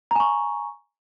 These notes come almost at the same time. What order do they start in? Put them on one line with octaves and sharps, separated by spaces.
A#5 G#5 C#6